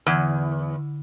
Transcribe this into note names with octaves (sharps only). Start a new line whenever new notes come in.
E2 D3 G#6